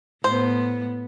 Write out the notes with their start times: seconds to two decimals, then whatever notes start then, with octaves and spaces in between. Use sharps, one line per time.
0.24 A2 B3 C5